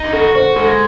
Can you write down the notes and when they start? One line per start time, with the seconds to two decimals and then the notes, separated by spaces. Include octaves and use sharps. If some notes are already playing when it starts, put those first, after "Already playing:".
Already playing: D#4
0.13 F#4 A4
0.35 F#4 C5
0.56 G#3 A4